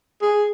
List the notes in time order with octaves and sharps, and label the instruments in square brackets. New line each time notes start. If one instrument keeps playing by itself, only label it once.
[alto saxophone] G#4